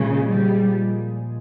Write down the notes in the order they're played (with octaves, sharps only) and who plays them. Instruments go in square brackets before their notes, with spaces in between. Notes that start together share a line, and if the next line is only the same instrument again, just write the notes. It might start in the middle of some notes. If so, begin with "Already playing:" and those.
Already playing: [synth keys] A#2 F3 G#3 G#4 [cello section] C#3
[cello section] G3